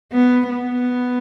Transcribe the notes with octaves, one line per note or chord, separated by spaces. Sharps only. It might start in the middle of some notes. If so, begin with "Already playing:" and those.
B3
B3